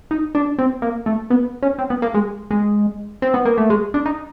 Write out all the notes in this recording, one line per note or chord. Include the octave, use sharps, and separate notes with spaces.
D#4
D4
C4
A#3
A3
B3
C#4
C4
B3
A#3
G#3
G#3
C4
B3
A#3
A3
G#3
D4
D#4